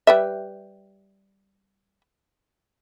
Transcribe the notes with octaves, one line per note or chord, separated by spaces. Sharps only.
G3 B4 E5